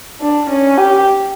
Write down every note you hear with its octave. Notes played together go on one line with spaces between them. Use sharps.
D4
C#4
G4